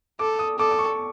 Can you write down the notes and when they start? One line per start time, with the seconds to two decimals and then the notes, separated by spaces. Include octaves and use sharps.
0.19 A4 D6
0.39 D#6
0.59 A4 D6
0.71 D6
0.79 C#6